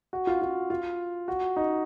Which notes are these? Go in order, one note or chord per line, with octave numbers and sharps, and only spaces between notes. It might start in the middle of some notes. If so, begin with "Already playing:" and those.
F#4
F4
F4
F4
F#4
D#4